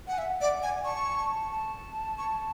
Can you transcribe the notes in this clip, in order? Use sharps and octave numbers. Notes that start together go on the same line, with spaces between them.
F#5 G#5
E5 F#5
D5
G#5
G#5
A5 C#6
A5
C#6